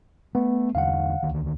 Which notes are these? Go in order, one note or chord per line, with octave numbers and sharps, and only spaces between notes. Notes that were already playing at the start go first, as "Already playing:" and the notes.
A3 B3
E2 D3 G3 F5 F#5
D2 D#3